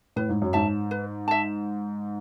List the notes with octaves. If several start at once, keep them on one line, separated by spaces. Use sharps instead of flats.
A2 B4
G#2
F#2
G#2 E5 A5
B4
E5 A5